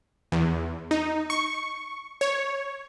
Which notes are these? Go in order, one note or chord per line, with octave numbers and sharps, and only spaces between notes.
E2
D#4
C#6
C#5